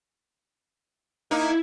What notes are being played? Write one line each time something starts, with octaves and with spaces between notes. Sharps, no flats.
A#3 D#4 E4 G#6